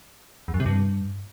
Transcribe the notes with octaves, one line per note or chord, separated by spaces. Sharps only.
E2
F#2
C3
G2